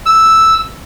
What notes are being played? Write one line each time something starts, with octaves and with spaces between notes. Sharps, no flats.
E6